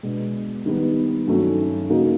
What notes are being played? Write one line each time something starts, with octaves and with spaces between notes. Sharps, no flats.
B2 G#3 B3 D4
D#3 G3 B3
G2 D#3 F#3 A3 C#4
C#3 F#3 A#3 D#4 F#4